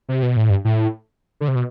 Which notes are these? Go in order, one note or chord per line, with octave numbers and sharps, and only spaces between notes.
C3
B2
A2
G2
A2
D3
C3
B2